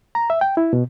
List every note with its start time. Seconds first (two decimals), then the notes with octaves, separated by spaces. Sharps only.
0.15 A#5
0.30 E5
0.41 G5
0.57 E4
0.73 B2